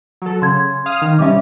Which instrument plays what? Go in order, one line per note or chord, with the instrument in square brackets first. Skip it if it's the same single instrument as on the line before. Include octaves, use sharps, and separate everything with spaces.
[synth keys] F#3 A4
[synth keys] C#3 [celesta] C6 G#6
[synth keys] F5 D#6 F6
D#3
[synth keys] C3 G3 C#4 [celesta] E5 D6